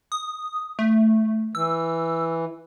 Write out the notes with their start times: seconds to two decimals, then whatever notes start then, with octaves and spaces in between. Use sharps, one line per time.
0.12 D#6
0.79 A3
1.55 E3 E6